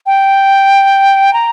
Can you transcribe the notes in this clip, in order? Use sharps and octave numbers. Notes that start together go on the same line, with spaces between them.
G5
A#5